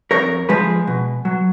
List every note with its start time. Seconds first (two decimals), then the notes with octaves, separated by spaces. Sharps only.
0.11 F2 A#4 C#5
0.49 F3 G#3 G#4 B4
0.87 B2
1.25 F#3